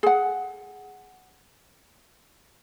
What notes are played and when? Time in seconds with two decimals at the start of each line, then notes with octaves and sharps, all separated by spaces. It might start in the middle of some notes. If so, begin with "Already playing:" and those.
0.03 G#4 F#5